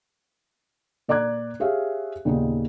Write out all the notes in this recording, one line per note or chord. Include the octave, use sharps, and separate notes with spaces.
A#2 D5 A#5 D6 F#6 G#6
G4 G#4 C#5 E5 F5
D#2 A#2 C#3 B3 D#4